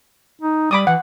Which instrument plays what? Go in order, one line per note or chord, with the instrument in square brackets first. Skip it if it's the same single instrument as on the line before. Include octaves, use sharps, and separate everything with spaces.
[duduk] D#4
[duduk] G3 [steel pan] B5 D6 D#6
[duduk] E3 [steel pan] F#5